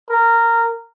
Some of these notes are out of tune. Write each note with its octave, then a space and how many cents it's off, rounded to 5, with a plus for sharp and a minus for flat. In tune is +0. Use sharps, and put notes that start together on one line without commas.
A#4 -15